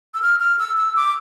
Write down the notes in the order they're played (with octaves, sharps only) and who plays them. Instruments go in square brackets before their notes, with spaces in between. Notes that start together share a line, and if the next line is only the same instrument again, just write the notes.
[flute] E6
F6
F6
E6
E6
D6